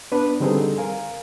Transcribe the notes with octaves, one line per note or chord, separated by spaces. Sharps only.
B3 D4 B4
D3 G3 C4 D#4 G#4 A4
A#4 F5 G#5